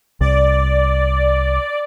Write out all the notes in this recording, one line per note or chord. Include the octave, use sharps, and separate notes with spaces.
C2 D5